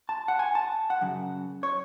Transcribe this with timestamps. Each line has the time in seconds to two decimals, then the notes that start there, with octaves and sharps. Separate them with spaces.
0.09 A5
0.28 F#5
0.39 G#5
0.55 A5
0.90 F#5
1.01 F#2 C#3
1.63 C#5